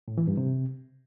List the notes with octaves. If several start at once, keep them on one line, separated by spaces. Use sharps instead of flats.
A2
E3
G2
C3